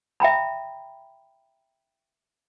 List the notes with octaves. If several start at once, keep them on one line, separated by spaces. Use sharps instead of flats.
E5 G5 A#5 B5